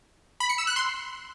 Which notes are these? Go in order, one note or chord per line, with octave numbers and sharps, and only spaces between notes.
B5
C#7
E6
F#6
C6